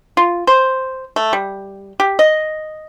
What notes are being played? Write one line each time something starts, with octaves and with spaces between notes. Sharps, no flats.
F4
C5
A3
G3
G4
D#5